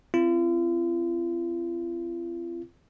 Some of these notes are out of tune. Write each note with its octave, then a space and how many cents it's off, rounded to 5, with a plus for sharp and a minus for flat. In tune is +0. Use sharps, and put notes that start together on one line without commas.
C4 -5 F4 -45